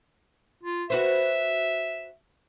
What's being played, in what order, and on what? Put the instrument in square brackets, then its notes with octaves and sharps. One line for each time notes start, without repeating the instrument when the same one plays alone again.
[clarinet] F4
[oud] F#4 B4 C5 [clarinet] E5